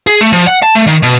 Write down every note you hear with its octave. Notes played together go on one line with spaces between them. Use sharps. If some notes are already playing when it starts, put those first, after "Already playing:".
G#4
A3
F3
F#5
A5
A3
D#3
B2